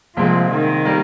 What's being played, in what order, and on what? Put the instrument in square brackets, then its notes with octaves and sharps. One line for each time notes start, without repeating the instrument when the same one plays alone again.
[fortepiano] C2 A#2 G#3 C4 [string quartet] F3
[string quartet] D#3
[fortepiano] G3 A#3